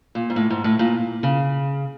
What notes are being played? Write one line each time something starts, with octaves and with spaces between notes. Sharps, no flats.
A#2
G#2
A2
G#2
A2
A#2
C#3